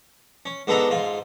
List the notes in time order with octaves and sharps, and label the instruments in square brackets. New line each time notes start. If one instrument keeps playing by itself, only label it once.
[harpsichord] C#4
G#2 B3 D4 A4 B4 A#5
G#2 F4